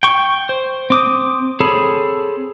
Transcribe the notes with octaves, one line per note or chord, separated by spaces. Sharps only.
G5 C#6
C5
C4 D6 D#6
C4 G#4 A4 C#5 B5